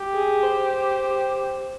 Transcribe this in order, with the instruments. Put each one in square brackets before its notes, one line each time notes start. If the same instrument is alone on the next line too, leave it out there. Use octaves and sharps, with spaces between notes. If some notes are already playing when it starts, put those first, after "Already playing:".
Already playing: [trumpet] G4
[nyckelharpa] G#4
C5